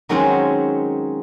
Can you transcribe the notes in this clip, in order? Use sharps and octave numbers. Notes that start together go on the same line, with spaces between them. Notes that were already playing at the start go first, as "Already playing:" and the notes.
D#3 F#3 G#3 C4 C#4 F#4